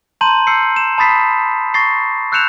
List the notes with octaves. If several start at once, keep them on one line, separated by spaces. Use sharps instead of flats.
A5 A#5 C6 G6 D#7 F#7
E6 G6 C7 C#7
E7
A5 B5 D#6 A6 B6 C7
C#6 A6 A#6 C7
E6 F#6 G6 C#7 E7 F7